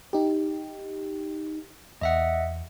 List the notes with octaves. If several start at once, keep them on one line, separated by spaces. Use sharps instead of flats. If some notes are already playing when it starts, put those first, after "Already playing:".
D#4 G4
E2 D#5 E5 F#5